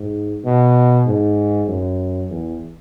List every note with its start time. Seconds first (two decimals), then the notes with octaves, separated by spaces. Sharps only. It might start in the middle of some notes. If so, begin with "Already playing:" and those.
Already playing: G#2
0.44 B2
1.06 G#2
1.68 F#2
2.30 E2